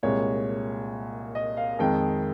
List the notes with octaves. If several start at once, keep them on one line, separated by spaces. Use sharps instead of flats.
C2 A#2 G#3 C#5
D#5
F5
F2 D#3 G#3 G5